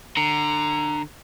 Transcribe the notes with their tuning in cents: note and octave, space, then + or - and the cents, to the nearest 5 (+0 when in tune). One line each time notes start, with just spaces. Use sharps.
D3 +25 A#5 +0